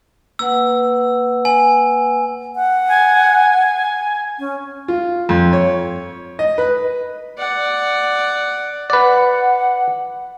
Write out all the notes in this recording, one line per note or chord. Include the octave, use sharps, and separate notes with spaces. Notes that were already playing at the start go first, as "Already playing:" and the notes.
A#3 B4 F#5 E6
G#5
F#5
G#5
C#4
F4
F2
C#5
D#5
B4
D5 F#5
B4 D5 F#5